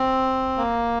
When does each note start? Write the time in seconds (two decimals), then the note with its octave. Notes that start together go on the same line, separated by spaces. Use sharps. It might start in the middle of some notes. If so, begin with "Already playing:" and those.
Already playing: C4
0.57 A#3